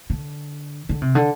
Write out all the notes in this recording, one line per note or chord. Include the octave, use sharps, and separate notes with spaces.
D3
D3
C3
D3